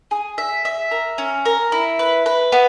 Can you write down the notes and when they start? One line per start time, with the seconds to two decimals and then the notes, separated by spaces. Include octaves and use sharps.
0.11 G#4
0.38 E5
0.65 E5
0.91 A#4
1.18 C#4
1.45 A#4
1.72 E4
1.99 B4
2.26 B4
2.52 B3